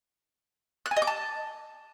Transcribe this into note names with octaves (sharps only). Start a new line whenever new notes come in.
F#6
G#5
D#5
D6
A5